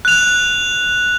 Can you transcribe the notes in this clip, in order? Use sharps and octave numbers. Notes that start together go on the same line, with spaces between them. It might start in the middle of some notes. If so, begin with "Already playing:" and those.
F#6 F7